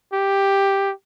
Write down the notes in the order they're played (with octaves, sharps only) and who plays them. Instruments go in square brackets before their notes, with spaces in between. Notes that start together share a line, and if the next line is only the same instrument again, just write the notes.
[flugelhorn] G4